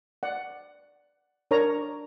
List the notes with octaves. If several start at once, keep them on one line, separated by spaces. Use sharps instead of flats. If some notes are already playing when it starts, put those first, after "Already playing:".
D5 F#5
D4 A#4 C#5 D5 A#5